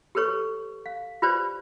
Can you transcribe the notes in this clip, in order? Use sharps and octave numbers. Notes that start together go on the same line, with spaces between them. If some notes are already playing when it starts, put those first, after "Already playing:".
G4 A4 B4 C#5 C#6
F5
F4 G4 B4 C5 D5